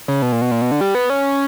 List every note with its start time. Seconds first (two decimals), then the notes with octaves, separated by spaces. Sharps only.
0.08 C#3
0.22 B2
0.32 A#2
0.42 B2
0.51 A#2
0.62 B2
0.71 D3
0.81 G3
0.95 B3
1.10 C#4